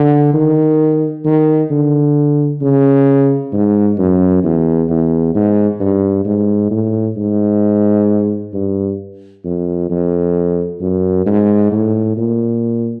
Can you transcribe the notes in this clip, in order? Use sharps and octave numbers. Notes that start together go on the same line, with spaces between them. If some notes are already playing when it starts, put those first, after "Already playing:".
Already playing: D3
D#3
D#3
D3
C#3
G#2
F#2
E2
E2
G#2
G2
G#2
A2
G#2
G2
F2
F2
F#2
G#2
A2
A#2